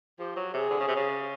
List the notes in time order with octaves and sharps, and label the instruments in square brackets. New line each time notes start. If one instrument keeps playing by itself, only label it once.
[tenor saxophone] F3 [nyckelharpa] G4
[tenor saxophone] F#3
[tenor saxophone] C3 [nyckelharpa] G#4
[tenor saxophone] D3
C#3
C3
C#3